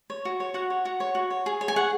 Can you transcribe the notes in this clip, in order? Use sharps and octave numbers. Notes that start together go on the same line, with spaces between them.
C#5
F#4
C#5
F#4 F#5
C#5
F#4
C#5
F#4
C#5
G#4
C#5
G#5
G#4 F#5